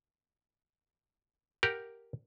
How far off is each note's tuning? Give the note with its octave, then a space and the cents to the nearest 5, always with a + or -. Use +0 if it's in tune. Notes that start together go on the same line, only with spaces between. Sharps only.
G4 +0 A#4 +0 F#5 +0